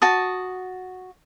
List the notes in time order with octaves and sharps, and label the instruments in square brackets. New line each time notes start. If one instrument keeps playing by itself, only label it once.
[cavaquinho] F#4 A5 D#6